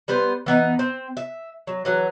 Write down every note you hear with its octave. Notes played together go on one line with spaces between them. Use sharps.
G3 B3 B4 C5
E3 B3 D#4
C4
E5
F#3
E3 F#3 G#4